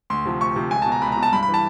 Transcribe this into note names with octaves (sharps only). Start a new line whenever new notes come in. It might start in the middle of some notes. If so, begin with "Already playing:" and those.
D2 C6
C3 F3
D2 C#6
C3 F3
C#2 G#5
B2 A5
A#5
C#2 B5
A#5
B2
A5
G2 B5
B5
E3
A5